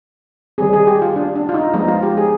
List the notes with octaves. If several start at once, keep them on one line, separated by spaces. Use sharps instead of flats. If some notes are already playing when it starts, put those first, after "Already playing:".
D#3 G3 C4 G#4
G#4
G4
F4
D4
D4
F4
D#4
F3 G#3 B3 D#4
F4
G4
G#4